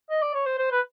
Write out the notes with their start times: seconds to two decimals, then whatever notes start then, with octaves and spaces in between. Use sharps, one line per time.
0.10 D#5
0.22 D5
0.34 C#5
0.46 C5
0.58 C5
0.71 B4